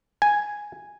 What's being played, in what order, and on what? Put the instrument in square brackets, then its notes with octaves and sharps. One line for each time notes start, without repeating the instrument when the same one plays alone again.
[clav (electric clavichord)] G#5